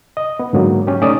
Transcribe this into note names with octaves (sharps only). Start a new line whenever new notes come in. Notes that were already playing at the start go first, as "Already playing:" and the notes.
D#5
B3
G#2 D3 F#3 A#3
C#4 G4
A3 C#4 D#4 D5 D#6